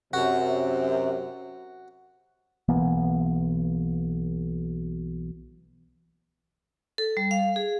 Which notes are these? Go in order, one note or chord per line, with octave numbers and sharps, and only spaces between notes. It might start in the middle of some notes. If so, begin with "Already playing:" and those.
F#2 C3 F#4
B1 E3 A#3 B3
A4
G3
F5
G#4